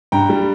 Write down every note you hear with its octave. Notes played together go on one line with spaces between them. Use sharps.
G2 G5 A#5
G3